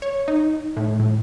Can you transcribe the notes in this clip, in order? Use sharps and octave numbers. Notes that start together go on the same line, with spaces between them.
C#5
D#4
A2
A2